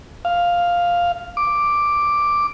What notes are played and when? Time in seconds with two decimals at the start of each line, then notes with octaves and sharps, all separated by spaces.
0.25 F5
1.37 D6